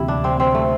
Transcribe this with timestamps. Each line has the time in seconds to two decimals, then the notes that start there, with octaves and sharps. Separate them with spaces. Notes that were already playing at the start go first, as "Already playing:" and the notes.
Already playing: D2 C3 E3 A#3 E4 G4
0.08 D4
0.24 C4
0.40 C4
0.55 A3